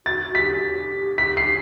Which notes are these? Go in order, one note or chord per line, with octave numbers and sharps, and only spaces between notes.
F#4 A6
G4 B6
F#4
G4
B6
C7